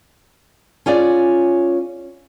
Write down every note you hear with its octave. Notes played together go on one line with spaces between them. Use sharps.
C#4 F4 G#4 D5